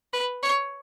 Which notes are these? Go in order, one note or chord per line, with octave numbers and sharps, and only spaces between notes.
B4
C#5